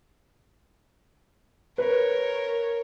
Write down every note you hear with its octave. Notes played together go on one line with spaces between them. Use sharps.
A#4 B4 C#5